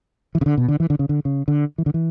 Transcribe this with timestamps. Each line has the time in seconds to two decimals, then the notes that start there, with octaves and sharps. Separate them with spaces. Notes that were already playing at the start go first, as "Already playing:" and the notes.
0.35 E3
0.41 C#3
0.46 D3
0.57 B2
0.68 D3
0.80 E3
0.90 D3
0.99 C#3
1.09 D3
1.25 C#3
1.48 D3
1.78 E3
1.86 D3
1.94 E3